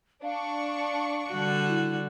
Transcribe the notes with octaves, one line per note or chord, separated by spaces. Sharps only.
D4 F5 C#6
D3 G3 F#4
E4